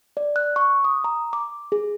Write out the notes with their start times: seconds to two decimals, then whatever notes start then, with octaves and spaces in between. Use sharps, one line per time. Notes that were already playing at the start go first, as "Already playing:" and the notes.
0.17 D5
0.36 F#6
0.56 C#6
0.84 D#6
1.04 A#5
1.33 D6
1.72 G#4